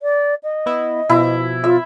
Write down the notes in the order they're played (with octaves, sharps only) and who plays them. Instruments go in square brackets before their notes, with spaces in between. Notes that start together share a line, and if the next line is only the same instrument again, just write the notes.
[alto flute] D5
D#5
[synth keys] B3 E4
[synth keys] B2 F3 [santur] E4
[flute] F4 [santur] E5